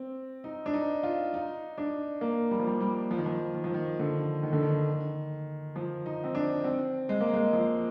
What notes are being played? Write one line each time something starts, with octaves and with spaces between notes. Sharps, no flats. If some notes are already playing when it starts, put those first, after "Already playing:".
Already playing: C4
D#4
D4
D#4
F4
D#4
D4
A#3
G3
F3
G3
G3
F3
D#3
F3
D#3
F3
D#3
D3
D#3
D3
D#3
F3
D#4
C4
D4
C4
G#3
A#3
G#3
F3